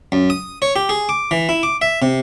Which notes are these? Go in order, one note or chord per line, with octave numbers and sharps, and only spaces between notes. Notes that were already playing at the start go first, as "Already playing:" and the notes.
F#2
D#6
C#5
G4
G#4
D6
E3
E4
D6
E5
C3